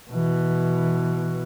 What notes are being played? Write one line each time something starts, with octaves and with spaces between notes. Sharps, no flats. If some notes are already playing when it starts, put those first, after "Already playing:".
B2 E3